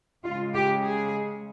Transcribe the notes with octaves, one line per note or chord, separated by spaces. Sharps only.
C#3 G#3 F4
G4
G#4